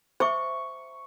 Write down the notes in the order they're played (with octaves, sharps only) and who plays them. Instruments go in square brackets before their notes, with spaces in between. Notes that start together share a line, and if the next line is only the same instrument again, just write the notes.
[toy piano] C5 E5 D6 [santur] C#6